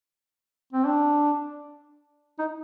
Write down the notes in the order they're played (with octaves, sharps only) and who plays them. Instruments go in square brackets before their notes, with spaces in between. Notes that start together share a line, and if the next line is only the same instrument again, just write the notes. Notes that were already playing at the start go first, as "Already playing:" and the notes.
[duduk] C4
D4
D#4